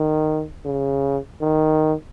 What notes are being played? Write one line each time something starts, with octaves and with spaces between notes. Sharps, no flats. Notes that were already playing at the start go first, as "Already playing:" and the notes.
Already playing: D#3
C#3
D#3